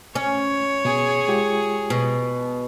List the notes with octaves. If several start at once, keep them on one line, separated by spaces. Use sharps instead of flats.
C#4 C#5
B2 G#4
G#3 F4 G4
B2